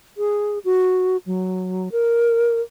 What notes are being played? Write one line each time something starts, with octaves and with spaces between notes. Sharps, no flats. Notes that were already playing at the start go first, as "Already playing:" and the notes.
G#4
F#4
F#3
A#4